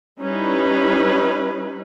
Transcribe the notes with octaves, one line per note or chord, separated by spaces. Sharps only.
G3 C#4 D#4 E4 B4